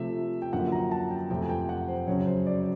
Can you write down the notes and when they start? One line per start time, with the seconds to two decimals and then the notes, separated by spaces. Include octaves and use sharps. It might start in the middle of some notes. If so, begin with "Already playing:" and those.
Already playing: C3 F3 A3 E5
0.42 G5
0.53 F#2 D3 F3 A#3 F#5
0.72 A#5
0.91 A5
1.11 G5
1.30 F2 C3 F3 A3 G5
1.41 G#5
1.49 G5
1.69 F#5
1.88 C5
2.07 F#2 C#3 F#3 C#5
2.27 C5
2.47 D5